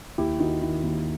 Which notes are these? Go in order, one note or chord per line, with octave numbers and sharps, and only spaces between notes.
D#2 E4 G4
D#3 D#4 F#4
D#3 E4
D#2